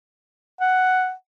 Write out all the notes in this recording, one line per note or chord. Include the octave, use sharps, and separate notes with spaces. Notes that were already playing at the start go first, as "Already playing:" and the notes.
F#5